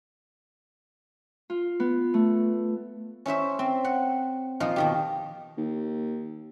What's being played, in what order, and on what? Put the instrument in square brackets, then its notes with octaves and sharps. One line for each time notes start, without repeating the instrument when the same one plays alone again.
[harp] F4
B3
A3
[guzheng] C#4 E4 C5 E5
C4
F#5
A#2 F3 D#4 F5
B2 D#3 G4
[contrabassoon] D#2